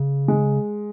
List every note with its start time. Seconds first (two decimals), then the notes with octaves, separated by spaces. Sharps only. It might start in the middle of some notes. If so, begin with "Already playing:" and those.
Already playing: C#3
0.28 G#3